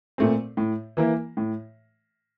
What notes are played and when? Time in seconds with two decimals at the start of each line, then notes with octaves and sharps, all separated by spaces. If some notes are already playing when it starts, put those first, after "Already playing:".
0.18 A#2 A3 C4
0.57 A2
0.97 E3 A#3 E4
1.37 A2